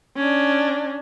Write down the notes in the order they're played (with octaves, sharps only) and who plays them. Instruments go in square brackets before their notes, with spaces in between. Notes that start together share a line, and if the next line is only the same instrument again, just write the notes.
[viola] C#4 D4